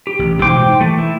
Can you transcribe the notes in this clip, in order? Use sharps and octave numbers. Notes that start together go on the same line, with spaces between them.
G4
A1
G#2 B2 E3 C5 G5 D6
E3 A3
E4